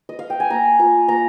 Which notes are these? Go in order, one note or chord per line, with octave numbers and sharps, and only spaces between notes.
D#5
F5
G5
G#5
A#3 A#5
F4 A#5
A#3 A#5